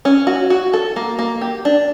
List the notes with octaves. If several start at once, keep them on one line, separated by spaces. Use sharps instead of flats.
C#4
F#4
F#4
A4
A#3
A#3
G4
D4